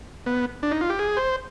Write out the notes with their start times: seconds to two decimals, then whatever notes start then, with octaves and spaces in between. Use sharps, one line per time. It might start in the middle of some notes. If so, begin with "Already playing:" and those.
0.26 B3
0.63 D4
0.71 D#4
0.81 F4
0.90 G4
0.99 G#4
1.17 C5